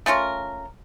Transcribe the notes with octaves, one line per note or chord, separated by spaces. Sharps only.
A3 C#4 F4 A#4